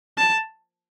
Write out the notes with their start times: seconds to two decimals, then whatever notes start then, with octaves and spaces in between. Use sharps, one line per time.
0.18 A5